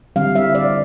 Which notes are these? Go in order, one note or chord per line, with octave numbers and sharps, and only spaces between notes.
D3 G3 C4 F5
E5
D5